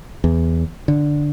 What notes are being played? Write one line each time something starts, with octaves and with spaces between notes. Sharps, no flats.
E2
D3